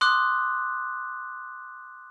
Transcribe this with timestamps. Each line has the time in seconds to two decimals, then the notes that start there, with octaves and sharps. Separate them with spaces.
0.01 C6 D6 D#6 F#6